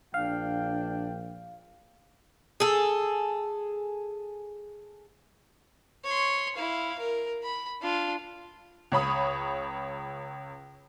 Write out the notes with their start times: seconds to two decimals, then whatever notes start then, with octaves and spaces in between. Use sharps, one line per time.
0.14 A#1 D4 F5 G5
2.60 G#4 A4
6.05 C#5 C6
6.56 E4 F5
6.99 A#4
7.43 B5
7.82 D4 F4
8.92 C#2 C#5 B5 D#6